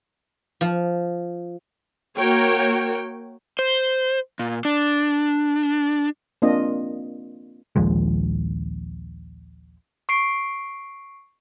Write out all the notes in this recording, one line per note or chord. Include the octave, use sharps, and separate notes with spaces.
F3
A#3 F#4 A#4 C#5 G5
C5
A#2
D4
A#3 C4 D4 F4 D#5
A#1 D#2 F3 G#3
C#6 C7 D7